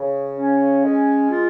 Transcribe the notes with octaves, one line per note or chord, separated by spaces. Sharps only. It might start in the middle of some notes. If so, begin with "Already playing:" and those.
Already playing: C#3
C#4
G#3
F4